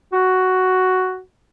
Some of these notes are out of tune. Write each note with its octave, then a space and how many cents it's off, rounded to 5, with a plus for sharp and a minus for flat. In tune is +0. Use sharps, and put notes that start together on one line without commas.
F#4 +5